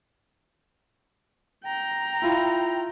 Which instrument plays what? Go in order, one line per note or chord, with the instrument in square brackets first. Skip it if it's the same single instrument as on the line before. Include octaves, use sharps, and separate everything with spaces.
[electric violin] G5 A#5
[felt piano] E4 F4